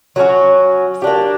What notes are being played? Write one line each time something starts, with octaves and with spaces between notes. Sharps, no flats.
F#3 A3 C#4 F#4
A#3 D4 G4